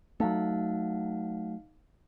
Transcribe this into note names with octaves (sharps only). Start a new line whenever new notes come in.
F#3 A3 D#4 F5 F#5